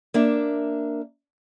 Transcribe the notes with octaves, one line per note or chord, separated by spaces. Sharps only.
A#3 D4 E5